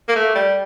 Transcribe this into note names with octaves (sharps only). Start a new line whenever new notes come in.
A#3
A3
G3